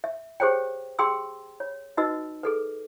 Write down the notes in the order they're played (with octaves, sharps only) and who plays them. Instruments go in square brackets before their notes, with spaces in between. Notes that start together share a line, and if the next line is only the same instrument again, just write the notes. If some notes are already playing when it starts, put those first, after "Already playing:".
[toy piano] E5
G4 G#4 C5 C#5 G5
G4 G#4 G5 C6 E6
C#5
D#4 F#4 B4 D#5 E6
G#4 A4 B4